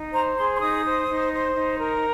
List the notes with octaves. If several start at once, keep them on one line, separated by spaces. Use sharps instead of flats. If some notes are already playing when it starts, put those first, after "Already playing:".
Already playing: D#4
C5 A#5
G#4 C6
C6
D#4 D#6
C5
D#4
C5
D#4
A#4